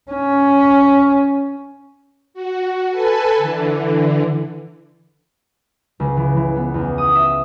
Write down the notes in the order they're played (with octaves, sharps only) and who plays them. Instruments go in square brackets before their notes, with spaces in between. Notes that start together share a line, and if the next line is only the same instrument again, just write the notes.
[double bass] C#4
[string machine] F#4
A4 B4 G#5 A5
D3 E3
[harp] C#2
E3
E3
B3
E2
D#6
E5